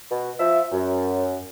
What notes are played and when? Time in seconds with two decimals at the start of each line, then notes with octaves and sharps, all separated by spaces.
0.11 B2
0.39 F3 E5
0.72 F#2